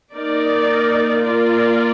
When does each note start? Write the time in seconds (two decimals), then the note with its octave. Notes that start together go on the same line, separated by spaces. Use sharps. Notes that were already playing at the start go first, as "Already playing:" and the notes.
0.13 A#3 D#4 A#4 D5
1.23 A#3 F4 A#4 D5